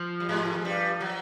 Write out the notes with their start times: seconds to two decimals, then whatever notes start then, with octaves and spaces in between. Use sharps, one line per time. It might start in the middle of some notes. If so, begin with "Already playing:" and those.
Already playing: F3
0.20 G3
0.29 G#2 G#3
0.45 A3
0.55 G#3
0.65 G2 G3
1.00 F#3